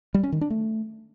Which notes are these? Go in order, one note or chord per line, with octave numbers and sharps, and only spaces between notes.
G3
C#4
D#3
D4
A3